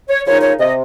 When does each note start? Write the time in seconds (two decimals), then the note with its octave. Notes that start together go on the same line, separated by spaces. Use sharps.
0.10 C#5
0.26 C#3 F3 A#3 D#4 C#5
0.42 C#5
0.60 C3 D#5